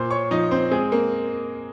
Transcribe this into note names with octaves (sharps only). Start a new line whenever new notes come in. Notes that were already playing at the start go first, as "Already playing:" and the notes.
Already playing: A#2 A#3 C5 C6
C#5 C#6
F3 D#4 D#5
C4 C5
G#3 C4 G#4
A#3 A#4